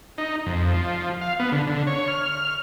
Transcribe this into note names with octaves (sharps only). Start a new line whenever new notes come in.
D#4
F2
F3
F5
B3
D3
D3
C#5
F6